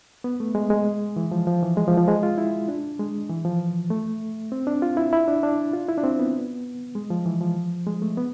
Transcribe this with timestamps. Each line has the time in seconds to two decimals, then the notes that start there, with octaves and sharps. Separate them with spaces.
0.24 B3
0.40 A3
0.55 G#3
0.70 G#3
1.16 E3
1.32 F3
1.47 F3
1.63 E3
1.77 G#3
1.88 F3
1.98 F3
2.08 G#3
2.23 F4
2.38 E4
2.68 D4
2.99 G#3
3.30 E3
3.45 F3
3.90 A3
4.52 C4
4.67 D4
4.82 F4
4.97 E4
5.13 E4
5.28 D4
5.43 D4
5.73 F4
5.88 E4
5.98 D4
6.03 C4
6.19 B3
6.95 G#3
7.10 F3
7.26 E3
7.41 F3
7.87 G#3
8.02 A3
8.17 B3